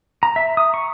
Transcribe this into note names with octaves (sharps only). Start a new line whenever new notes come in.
A#5
E5
D#6
C#6